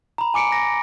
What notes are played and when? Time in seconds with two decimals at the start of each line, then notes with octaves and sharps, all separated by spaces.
0.18 A#5 B5
0.34 G#5 D6 C#7 D7
0.52 A#6